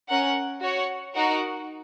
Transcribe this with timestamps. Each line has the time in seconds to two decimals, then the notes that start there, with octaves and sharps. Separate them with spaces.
0.09 C#4 A#4 F#5
0.61 F#4 C#5 F#5
1.15 D#4 F#4 A#4 F#5